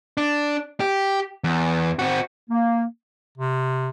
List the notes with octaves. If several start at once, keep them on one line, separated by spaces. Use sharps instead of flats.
D4
G4
E2
C4 F#4
A#3
C3